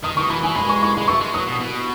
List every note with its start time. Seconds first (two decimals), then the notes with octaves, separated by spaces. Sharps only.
0.04 D#3 D#6
0.17 D#3 C#6
0.29 E3 B5
0.43 E3 G#5
0.55 G#3 B5
0.69 C#6
0.82 C#6
0.95 G#3 B5
1.08 A3 C#6
1.20 G#3
1.33 F#3 D#6
1.47 B2
1.60 B2